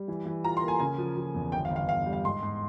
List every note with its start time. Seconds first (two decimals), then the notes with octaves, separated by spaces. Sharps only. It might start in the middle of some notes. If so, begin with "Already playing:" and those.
Already playing: G3
0.08 E3
0.26 E3
0.44 F4 A#5
0.57 C6
0.63 A#3
0.68 G#5
0.80 C#3 G#5
0.98 F3
1.17 F3
1.35 E2
1.52 G1 G5
1.65 F5
1.70 G1
1.76 F5
1.88 G1 F5
2.06 G3
2.13 F5
2.24 G#2 C6
2.42 G#2